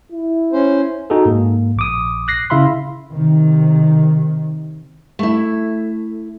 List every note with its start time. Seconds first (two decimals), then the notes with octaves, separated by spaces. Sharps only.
0.12 E4
0.53 C#4 C5
1.10 D#4 F#4 G#4 A4
1.25 G#2 A#3
1.76 A#1 D6 D#6
2.28 F#6 A#6 C7
2.50 C#3 E4 E5 F5 B5 C6
3.12 C3 D#3
5.19 A3 E4